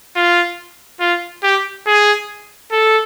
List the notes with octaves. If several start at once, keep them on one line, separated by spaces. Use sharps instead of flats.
F4
F4
G4
G#4
A4